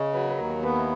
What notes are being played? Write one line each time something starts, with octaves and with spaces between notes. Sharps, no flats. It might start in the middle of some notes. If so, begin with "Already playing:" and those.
Already playing: C#3 C#5 D#5
F#3 B4
A#4
B4
D#2 A#4
A#4
B3 B4
E4